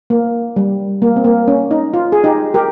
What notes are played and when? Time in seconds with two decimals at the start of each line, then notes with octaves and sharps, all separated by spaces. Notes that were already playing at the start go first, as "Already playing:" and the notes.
0.10 A#3
0.56 G3
1.02 A#3
1.16 C4
1.24 A#3
1.48 C#4
1.71 D#4
1.94 F4
2.12 G#4
2.24 D#4 G4
2.54 G4 A#4